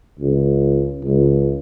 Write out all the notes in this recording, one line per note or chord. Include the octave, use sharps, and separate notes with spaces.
C#2
C#2